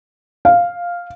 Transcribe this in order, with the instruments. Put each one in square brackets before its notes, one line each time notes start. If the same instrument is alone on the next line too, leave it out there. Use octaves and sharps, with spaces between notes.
[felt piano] F5